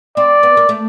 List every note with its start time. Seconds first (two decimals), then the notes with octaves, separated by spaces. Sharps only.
0.17 C4 D5
0.43 B3
0.57 A#3
0.69 A3